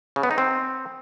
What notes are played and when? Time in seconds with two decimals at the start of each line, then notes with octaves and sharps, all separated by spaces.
0.16 C#3
0.23 B3
0.31 D#4
0.38 C4